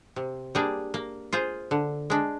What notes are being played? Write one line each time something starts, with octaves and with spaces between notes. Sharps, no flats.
C3
G3 A#3 D4 G#4
A#3
F4 G#4 C5
D3
G#3 D4